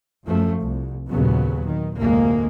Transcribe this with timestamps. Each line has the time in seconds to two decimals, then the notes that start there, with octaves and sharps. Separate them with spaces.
0.23 F#2 F3 A3
0.59 C2
1.10 D#2 A#2 C#3 F#3 B3
1.64 D#3
1.98 F1 D2 A2 G#3 A#3